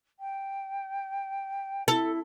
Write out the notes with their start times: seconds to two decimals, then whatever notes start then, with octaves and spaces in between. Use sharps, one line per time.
0.19 G5
1.88 E4 A4